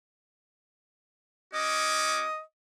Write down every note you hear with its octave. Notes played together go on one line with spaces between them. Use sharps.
C#4 F#4 D#5 D6